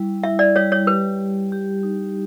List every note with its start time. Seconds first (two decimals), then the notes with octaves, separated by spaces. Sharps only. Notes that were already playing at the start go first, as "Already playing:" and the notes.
Already playing: G3 E4
0.23 E4 E5
0.39 D5
0.56 G3 C#5
0.72 C#5
0.87 G4 B4
1.19 G4
1.52 G4
1.83 D#4